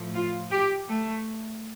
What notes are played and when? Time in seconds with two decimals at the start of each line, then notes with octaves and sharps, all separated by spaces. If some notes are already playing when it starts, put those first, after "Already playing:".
Already playing: A2 F3
0.14 F4
0.51 G4
0.87 A3